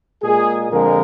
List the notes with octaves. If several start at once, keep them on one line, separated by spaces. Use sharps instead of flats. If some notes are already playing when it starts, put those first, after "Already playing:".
A#2 G#3 G#4
F2 D3 F3 G#3 A#4